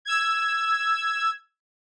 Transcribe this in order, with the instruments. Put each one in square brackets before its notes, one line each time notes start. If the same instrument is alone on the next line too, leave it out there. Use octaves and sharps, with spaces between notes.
[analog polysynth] E6 G#6